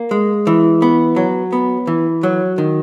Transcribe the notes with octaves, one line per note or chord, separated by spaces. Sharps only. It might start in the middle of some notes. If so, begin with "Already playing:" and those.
Already playing: A#3
G#3
E3
B3
F#3
B3
E3
F#3
D#3